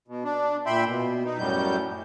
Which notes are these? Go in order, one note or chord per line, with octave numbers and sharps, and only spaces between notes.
B2
D4
A#2 E5 G5 B5 C6
B2
D#4
F#2 A2 F#3 G3 G6